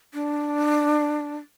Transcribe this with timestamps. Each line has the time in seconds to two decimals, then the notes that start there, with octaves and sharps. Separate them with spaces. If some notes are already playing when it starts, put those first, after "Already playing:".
0.14 D4